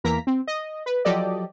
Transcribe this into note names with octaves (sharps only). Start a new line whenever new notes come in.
E2 E3 A#3 A#4 A#5 B6
C4
D#5
B4
F3 F#3 G4 A4 D5 D#5